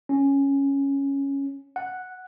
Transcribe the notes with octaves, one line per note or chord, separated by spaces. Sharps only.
C#4
F#5